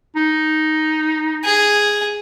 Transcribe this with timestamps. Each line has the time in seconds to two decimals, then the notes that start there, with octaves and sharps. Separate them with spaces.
0.16 D#4
1.45 G#4